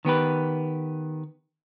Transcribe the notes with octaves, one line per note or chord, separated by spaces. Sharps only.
D#3 B3 G4 B4